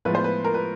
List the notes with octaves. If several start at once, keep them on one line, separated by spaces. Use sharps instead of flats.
A2 F3 G#3 B3 B4
C5
B4
A#4
B4